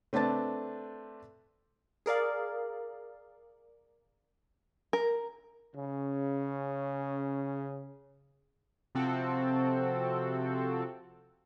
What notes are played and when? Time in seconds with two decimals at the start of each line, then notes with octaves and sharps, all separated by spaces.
0.13 A3 C4 D4 B4 A5 A6
2.06 G#4 A#4 D5 F5
4.93 A#4
5.75 C#3 C#4
8.95 C3 F3 C4 F#4 A4